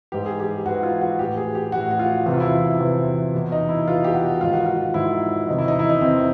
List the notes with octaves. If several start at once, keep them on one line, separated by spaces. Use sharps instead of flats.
G#2 E3 G4
G#4
G4
G#2 E3 F#4
F4
F#4
A2 E3 G4
G#4
G4
E3 F#4
A2
F#4
F4
E2 C3 E3 F#4
F4
E4
F4
E2 C3 E3
E2 B2
D#4
E4
E2 B2 F4
G4
F#4
G#2 D#3 F4
F#4
F4
G#2 D#3 E4
E2 C3 D#3 D#4
E4
D#4
E4
D#4
E2 C3 D#3 C4